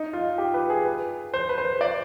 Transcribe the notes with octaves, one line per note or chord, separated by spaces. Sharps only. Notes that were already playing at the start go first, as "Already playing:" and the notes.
Already playing: D#4
F4
G4
B4
G#4
B4
C5
B4
C5
D5